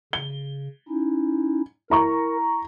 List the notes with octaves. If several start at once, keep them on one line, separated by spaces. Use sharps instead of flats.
C#3 G7
C#4 D#4 E4
E4 A#4 A#5 C#6